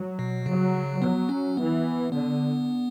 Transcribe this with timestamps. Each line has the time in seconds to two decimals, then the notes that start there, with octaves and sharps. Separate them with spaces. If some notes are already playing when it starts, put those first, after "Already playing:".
Already playing: F#3
0.19 B2
0.46 C#3 F#3
1.01 F#3 B3
1.29 C#4
1.57 E3 B3
2.12 D3 B3